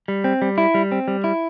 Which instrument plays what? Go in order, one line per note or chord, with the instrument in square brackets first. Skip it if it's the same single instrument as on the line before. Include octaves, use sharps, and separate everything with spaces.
[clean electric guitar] G3
C4
G3
E4
G3
C4
G3
E4